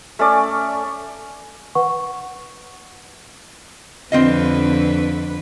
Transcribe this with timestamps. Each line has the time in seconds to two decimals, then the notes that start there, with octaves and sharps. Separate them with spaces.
0.19 A3 C#4 D5
1.75 B4 F#5 C#6
4.12 F2 D3 C4 F4 B4 D#5